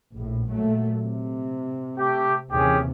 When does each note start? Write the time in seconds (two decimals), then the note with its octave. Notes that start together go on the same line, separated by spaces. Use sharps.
0.18 A#1 A2
0.53 A#2 F#3 A3
1.01 C3
1.97 A3 G4
2.52 D#2 C3 E3 C#4 G4 G#4